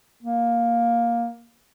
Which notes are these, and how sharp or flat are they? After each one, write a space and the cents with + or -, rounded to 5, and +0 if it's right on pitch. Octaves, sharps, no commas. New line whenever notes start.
A#3 +10